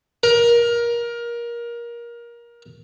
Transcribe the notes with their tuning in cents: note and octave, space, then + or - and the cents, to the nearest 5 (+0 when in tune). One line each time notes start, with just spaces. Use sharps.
A#4 +20